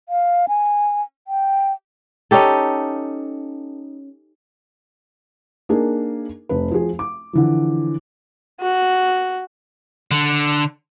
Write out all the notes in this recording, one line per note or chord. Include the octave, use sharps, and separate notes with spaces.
F5
G#5
G5
C#4 D#4 G4 A4
A#3 D4 D#4 G#4 A#4
F1 B4
F3 F#4 G#4
D6
D3 E3 F3
F#4
D3